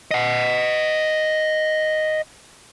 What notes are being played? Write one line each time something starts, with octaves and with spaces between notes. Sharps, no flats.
D#5 F#5